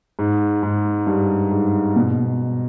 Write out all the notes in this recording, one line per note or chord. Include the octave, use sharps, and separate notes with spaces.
G#2
G#2
G2
G#2
B2